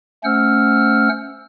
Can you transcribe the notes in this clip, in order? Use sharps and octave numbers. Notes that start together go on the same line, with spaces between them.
A3 C#4 C5 F#5 E6 F6